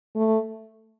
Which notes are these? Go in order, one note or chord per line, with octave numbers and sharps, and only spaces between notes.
A3